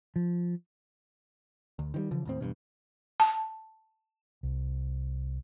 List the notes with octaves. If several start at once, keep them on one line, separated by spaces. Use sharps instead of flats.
F3
D2
D#3 E3 G3
C#3 E3 F3
D#2 A2 C4
E2 G2 B2
A5
C2